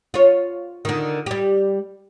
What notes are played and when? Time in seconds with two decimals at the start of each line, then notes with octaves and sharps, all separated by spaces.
0.14 F4 C#5
0.85 D3 D#3
1.26 G3 G4